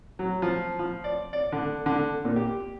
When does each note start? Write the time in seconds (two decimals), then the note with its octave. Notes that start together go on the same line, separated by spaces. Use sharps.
0.19 F#3
0.42 F3
0.79 F3
1.04 D5
1.33 D5
1.52 D3
1.86 D3
2.25 A#2
2.36 G4